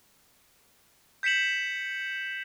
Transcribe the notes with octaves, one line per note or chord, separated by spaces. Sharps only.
G6 B6 C#7 E7 F#7